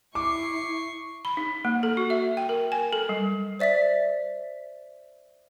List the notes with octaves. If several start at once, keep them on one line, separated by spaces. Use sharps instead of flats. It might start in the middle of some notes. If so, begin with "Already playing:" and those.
E4 C#6 D6 C7
B5
D#4
A#3
A4
F#4
E5
G5
A#4
G#5
A4
G3
C5 D5 E5 A6 B6